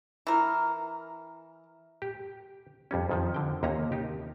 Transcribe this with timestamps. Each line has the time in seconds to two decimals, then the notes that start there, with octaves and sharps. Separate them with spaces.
0.27 E3 A#4
2.02 G4
2.91 F2 G3 C#4
3.09 F2 D#3 F3
3.34 D3 G5
3.63 D#2 C3 A#3 C#4 D#4 A#5
3.92 D#4 G4